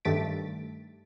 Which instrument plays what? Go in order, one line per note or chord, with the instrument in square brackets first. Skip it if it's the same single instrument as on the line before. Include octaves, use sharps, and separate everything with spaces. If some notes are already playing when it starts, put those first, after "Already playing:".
[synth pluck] G2 D#3 A3 A6 B6 D7